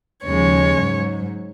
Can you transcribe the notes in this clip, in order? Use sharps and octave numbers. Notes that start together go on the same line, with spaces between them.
D#2 C#3 F3 G#3 C#5
G#2 F#3